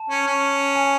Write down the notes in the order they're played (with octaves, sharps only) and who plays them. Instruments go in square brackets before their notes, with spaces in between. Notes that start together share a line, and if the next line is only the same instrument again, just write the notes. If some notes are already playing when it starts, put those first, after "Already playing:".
Already playing: [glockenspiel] A5
[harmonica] C#4
C#4
[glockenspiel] G#5